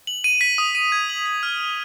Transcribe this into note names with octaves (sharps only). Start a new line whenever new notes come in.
F#7
D#7
B6
D#6
D#7
G#6
F#7
B6
F6
F7